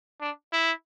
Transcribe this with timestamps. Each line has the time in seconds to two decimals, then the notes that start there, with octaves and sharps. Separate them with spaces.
0.21 D4
0.53 E4